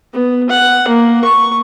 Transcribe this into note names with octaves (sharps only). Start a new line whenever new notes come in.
B3
F#5
A#3
C#6